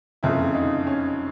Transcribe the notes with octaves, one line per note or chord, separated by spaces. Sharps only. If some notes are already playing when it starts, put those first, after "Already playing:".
F#1 F2 C#3 E4
D#4
C#4